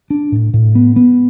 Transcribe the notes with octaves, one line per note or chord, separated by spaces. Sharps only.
D4
A2
A2
B3
B3